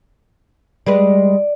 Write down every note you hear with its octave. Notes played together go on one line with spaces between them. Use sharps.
G3 G#3 B4 D5